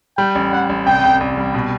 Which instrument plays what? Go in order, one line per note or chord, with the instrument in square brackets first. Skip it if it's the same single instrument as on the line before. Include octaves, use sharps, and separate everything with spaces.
[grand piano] G3 [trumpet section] G5
[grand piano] A1
[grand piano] A1 [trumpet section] F#5
[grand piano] A1
[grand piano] C2 [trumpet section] G5
[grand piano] C2
C2
G3
B2